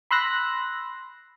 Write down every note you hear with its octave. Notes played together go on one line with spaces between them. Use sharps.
B5 C6 E6 F#6 A#6